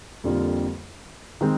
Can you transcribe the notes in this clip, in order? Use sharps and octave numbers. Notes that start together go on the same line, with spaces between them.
F2 D3 G3 A#3 F4
D#3 G#3 C4